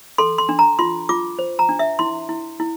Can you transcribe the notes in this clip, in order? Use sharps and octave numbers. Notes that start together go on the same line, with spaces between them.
A4 C6
C6
D4
A#5
F4 C6
F4 D6
C5
A#5
D4
E5
E4 C6
E4
E4